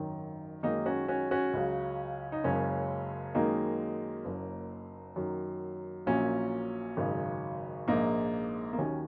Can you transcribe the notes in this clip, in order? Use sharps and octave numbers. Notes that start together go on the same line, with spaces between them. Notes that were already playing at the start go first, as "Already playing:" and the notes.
Already playing: G#1 F#2 D#3 F#3
F#2 D#3 G#3 A#3 D#4
C#4 F#4
C#4 F#4
C#4 F#4
C#2 C#3 F#3
D#4
F#1 F#2 C#3 G#3 C#4
F#2 D#3 G#3 A#3 D#4
F#1 F#2 F#3
F#2 D#3 F#3
A#1 A#2 F#3 C#4
G#1 F#2 C#3 G#3
A#1 G#2 G#3 A#3 D#4
A#3
D#2 D#3 F#3 C#4